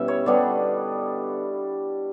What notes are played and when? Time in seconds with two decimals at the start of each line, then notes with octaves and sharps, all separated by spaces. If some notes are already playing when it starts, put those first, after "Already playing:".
Already playing: B2 G3 C#4 E4 E5
0.08 C#5
0.26 D3 G3 B3 D4 D5